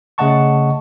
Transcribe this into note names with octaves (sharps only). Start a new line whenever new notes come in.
C#3 A3 D#5 F#5 A5 C#6